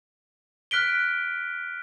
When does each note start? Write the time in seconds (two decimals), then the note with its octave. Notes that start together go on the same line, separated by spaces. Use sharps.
0.71 F6 F#6 B6 D7 G7